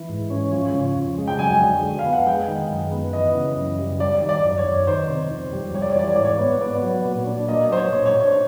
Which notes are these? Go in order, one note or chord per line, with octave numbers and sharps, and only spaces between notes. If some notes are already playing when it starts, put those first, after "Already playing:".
Already playing: E3
G#2
C#4
F3
C#3
F2
G#3
G5
F#3 G#5
D3
F2
F5
B3
F#5
G#3 G5
D#3
F#2
B3
E3 D#5
C#3
F#2
G3
G3 D5
D#3
D5
F#2
C#5
F#2
D#3 C5
C3
F2
G3
G3 C#5
D5
C#5
E3 D5
C#5
G#2 D5
C#5
B3
B3 D5
F#3
A#2
D4
A#3 D#5
F#3 C5
C#5
A#2
C#5
D4